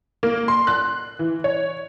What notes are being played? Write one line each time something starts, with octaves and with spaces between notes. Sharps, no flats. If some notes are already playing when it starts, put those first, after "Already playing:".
A#3
C6
F#6
E3
C#5